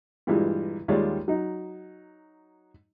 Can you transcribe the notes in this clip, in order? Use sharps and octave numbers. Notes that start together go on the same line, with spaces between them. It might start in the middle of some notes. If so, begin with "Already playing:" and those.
G2 A#2 E3 G3 G#3
D#2 G3 G#3 F4 C#5 D5
F#3 D#4